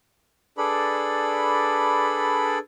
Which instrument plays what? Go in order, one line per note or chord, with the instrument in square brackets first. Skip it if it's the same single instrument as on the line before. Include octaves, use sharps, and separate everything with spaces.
[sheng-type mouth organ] D4 G#4 A4 B4 D5 B5